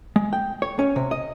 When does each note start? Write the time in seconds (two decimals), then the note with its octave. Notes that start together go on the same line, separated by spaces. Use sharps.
0.16 G#3
0.33 G5
0.62 C#5
0.79 C#4
0.96 C3
1.11 D#5